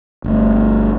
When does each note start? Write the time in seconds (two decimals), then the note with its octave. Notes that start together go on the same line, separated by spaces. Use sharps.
0.24 G1 A3